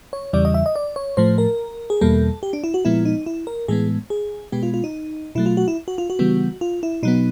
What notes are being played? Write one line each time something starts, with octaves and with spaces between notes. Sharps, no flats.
C#5
E2 C#3 E3 G3 D5
D#5
E5
D#5
D5
C#5
A2 F3 A3 C5
A#4
G#4
E2 B2 G3 A#3 A4
G4
D4
E4
F#4
A#2 F3 G#3 B3 E4
D#4
E4
A#4
A2 E3 G#3 B3 G#4
G#4
B2 G#3 B3 G4
F4
F4
D#4
B2 F#3 A3 E4
F4
F#4
E4
F#4
F4
F#4
C#3 E3 G3 B3
F4
E4
B2 F#3 B3 D#4